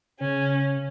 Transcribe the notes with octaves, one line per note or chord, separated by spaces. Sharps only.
C#3 C#4